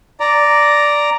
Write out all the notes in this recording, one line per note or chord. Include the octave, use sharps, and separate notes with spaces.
D5 A#5